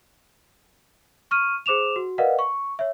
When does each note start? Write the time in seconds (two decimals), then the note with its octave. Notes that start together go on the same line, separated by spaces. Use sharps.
1.31 C#6 F6 D#7
1.66 G#4 C5 D6 E7 F7
1.96 F#4
2.18 A#4 B4 D5 D#5 F5 F#5
2.39 C#6
2.79 C#5 E5